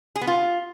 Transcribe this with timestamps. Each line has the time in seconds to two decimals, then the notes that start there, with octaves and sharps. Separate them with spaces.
0.16 G#4
0.21 B3
0.27 F4